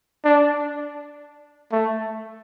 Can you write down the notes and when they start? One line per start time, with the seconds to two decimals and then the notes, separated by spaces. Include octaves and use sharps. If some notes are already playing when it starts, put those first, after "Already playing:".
0.25 D4
1.72 A3